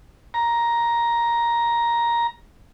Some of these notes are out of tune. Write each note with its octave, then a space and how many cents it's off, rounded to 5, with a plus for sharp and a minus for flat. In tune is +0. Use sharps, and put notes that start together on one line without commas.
A#5 +10